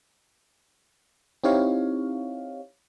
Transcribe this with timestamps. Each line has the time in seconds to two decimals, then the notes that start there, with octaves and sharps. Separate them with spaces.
1.44 C4 D#4 E4 G4 C#5 F5